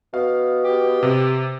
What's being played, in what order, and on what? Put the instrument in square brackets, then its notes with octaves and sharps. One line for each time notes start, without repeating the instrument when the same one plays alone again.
[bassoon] B2 [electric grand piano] F5
[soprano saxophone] G4
[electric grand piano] C3